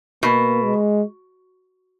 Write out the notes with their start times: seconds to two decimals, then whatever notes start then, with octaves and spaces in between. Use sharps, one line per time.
0.23 B2 A#3
0.64 G#3